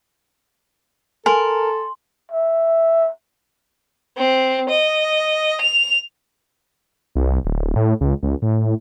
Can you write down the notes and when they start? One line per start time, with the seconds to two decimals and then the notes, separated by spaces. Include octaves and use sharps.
1.26 A4 A#4 G#5 C6
2.32 E5
4.17 C4
4.69 D#5
5.61 F7
7.15 C2
7.45 D1
7.76 A2
8.01 C#2
8.23 C#2
8.42 A2